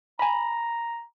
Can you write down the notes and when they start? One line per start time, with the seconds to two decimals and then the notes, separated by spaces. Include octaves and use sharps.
0.19 G#5 A#5 B5